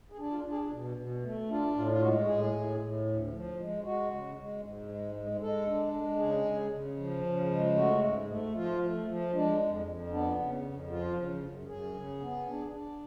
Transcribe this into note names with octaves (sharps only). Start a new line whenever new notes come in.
G#4
D4
F4
D4
G#4
B2
B2
A3
D4 F4
A2 F4
F4
G#3 F#4
A2 G#4
A2
A2
D2
F3
G#3
G#3 F#4
C#3
G#3
G#2
G#3
G#3
G#3 A4
D4
G#3
C#3 G#4
C#3
C#3
F3
C#3
G#3
A3 F#4
G#2
A3
F3 F4
A3
F3
G#3 D4
F2
F2
B3 D4
C#3
F2
F3 F4
C#3
F#2
F#2 G#4
C#3
B3
D4
D4